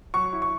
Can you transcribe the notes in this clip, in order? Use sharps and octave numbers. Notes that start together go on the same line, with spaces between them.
F#3 C#6
E4
C#6